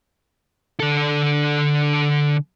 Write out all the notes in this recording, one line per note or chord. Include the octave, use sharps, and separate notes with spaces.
D3 A4